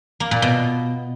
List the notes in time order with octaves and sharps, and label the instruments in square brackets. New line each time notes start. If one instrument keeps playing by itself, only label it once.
[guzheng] A#3
A#2
B2